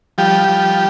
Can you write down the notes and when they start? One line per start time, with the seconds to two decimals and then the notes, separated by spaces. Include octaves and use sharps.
0.18 F3 G3 G4
0.48 F3